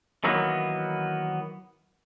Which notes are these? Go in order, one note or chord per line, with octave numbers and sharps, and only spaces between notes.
D#3 E3 F#3 A#3 B3